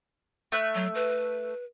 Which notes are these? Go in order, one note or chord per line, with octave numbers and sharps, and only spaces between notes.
A3 E5 F#6
F#3
B4